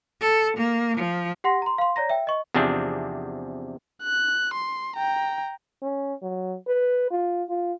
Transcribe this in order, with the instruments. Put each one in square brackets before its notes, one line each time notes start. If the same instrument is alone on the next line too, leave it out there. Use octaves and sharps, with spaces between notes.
[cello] A4
A#3
F3
[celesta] G4 F#5 C6 A#6
A#5 C6
F5 C6
C#5 D5 A#5 A#6
E5 G5
D#5 C#6
[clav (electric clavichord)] E2 C3 F3 C4 D4 G#4
[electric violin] F#6
C6
G5 A#5
[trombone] C#4
F#3
B4
F4
F4